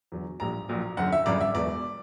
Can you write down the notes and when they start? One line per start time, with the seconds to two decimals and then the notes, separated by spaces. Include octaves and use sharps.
0.12 E2 D3 F#3
0.40 A#1 A#2 G3 A#5
0.69 A#1 A#2 F#3
0.97 F#1 F#2 D3 F#5
1.12 E5
1.26 G1 F#2 C#3 D5
1.41 E5
1.55 E1 E2 B2 F#3 D5